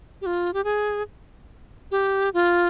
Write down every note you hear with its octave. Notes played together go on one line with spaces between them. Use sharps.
G4
F4
G4
G#4
G4
F4